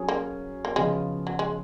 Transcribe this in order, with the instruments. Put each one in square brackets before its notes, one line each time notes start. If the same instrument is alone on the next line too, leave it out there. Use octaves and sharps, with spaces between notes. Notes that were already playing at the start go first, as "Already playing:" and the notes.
Already playing: [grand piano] F#3 C#4 G#4 C#5
[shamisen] A#3
A#3
[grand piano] C#3 F3 B3 F4 [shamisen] G#3
[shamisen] F#3
G#3